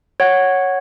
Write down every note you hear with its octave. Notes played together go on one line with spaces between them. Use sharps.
C#5 F#5